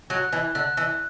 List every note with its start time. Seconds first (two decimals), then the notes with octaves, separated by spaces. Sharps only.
0.10 F#3 F#6
0.33 E3
0.55 D3 F#6
0.77 E3